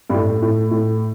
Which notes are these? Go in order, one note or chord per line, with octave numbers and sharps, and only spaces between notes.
G2
A2
A2
A2